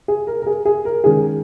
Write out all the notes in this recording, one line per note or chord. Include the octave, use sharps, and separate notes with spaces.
G#4
A#4
A#4
G#4
G#4
A#4
D#3 G#3 C#4 G#4